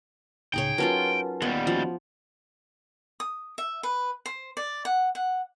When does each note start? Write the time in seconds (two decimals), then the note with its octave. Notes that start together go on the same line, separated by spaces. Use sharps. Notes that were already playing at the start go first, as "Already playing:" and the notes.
0.54 C#2 A2 C#3 D#4 G#4 C#5 G5
0.78 F#3 C#4 F4 A#4 B4 A5
1.42 D#2 G3 B3
1.67 F3 C#4 F#4
3.20 D#6
3.58 E5
3.83 B4
4.26 C5
4.57 D5
4.85 F#5
5.15 F#5